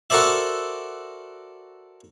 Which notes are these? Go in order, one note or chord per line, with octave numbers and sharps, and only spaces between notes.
F#4 A4 A#4 C5 D5 E5